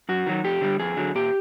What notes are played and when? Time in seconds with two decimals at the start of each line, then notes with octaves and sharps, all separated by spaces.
0.09 F#2 F#4
0.26 D#3 F#3
0.44 F2 G4
0.61 D3 G3
0.79 F2 G#4
0.97 D3 F#3
1.15 A#2 G4